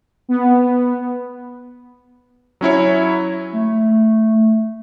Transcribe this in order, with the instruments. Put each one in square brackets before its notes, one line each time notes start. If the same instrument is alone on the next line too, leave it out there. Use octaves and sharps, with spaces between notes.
[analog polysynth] B3
[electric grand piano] F#3 C#4 E4 C#5
[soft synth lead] A3